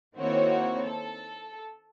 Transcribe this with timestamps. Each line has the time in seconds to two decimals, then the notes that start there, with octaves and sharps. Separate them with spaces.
0.17 D#3 A#3 C4 E4 F#4 C#5
0.84 A4